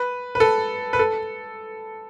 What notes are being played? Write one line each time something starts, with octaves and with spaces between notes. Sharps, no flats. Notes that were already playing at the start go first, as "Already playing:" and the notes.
Already playing: B4
B4
A4
B4
A4